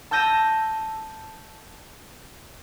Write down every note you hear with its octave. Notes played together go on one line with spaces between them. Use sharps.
A5 E6 G6 A#6 D#7 E7